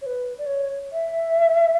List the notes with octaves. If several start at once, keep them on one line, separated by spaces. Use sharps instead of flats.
C#5
B4
D5
C#5
E5